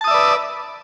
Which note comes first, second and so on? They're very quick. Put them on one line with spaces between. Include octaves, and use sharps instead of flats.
A5 D#6 E5 D5 B4